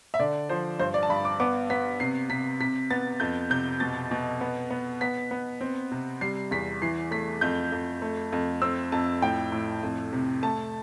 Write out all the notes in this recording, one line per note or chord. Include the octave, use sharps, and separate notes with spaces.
E5
D3 D5
F3 C5
G2 C5
D5
A5
G2 B5
D6
B3 D6
B3 B6
C3 C7
C3 B6
C3 B6
B3 A6
F2 G6
C3 G6
B2 A6
B2
B3
B3
B3 B6
B3
C4
C3
G3 C7
E2 B6
E3 C7
A3 B6
F2 G6
F2
A3
F2
C4 E6
F2 A5
A2 G5
A2
F2
C3
A3 A5